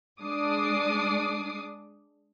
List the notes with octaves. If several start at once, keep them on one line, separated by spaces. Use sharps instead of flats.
G#3 D4 D6 D#6 C7